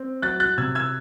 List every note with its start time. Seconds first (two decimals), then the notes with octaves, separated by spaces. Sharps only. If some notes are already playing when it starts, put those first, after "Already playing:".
Already playing: C4
0.22 F#3 F#6 A6
0.40 F#6 A6
0.58 C3 E6 G#6
0.75 E6 G#6